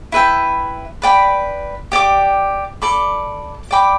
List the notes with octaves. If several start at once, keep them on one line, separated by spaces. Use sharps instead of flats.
E4 B4 E5 G5
B4 D5 G5 B5
G4 D5 G5 D6
A4 D5 B5 D6
D5 G5 B5 D6